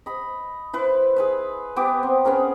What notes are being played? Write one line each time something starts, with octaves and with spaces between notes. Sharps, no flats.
D#5 B5
E4 B4 C5
G#4 B4 E5
B3 G4 D6
C4
B3 C#4 G#4 A#4